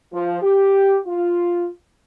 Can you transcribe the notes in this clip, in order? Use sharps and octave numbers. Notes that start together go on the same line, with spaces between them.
F3
G4
F4